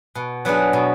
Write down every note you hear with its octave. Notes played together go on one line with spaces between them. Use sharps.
B2
F#3 B3 D4 G#4
B2